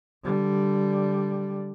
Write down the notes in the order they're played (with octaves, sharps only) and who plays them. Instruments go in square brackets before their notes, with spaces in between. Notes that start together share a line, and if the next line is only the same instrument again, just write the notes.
[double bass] D3 G3